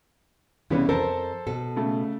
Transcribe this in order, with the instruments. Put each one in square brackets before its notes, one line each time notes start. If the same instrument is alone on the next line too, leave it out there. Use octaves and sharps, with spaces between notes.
[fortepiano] C2 C#3 B3 [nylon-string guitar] E3 C#4
[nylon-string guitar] F2 A#4 [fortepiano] A4 C5 A5
[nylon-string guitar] B2 A4
[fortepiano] C#3 A3